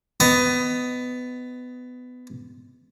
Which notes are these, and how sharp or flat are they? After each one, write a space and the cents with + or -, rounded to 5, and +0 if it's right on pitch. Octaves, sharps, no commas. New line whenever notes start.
B3 +20 D#5 +0